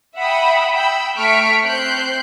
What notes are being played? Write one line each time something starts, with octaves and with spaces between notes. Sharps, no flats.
E5 F#5 G5 B5 D#6
G5 B5 E6 G6
A3 C#6 F6 B6 C#7 D7
C4 F#6 G6 C7